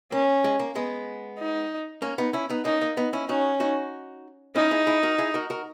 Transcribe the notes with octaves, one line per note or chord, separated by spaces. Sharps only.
A#3 C#4
G#3
A#3
G#3 B3
D#4
A#3 C#4
B3 D#4
C#4 E4
B3 D#4
A#3 C#4 D#4
A#3
B3 D#4
C#4 E4
C#4 D#4 F#4
D#4 F#4
C#4 D#4 E4
E4 G#4
E4 G#4
F#4 A#4
E4 G#4
F#4 A#4
F#4 A#4